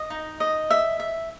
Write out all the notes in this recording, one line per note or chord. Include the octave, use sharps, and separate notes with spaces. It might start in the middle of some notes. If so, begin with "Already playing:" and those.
Already playing: D#5
D#4
D#5
E5
E5